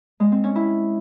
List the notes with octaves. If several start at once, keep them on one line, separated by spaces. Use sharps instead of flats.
G#3
C4
C#4
E4